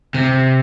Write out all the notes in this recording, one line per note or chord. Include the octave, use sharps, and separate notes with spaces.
C3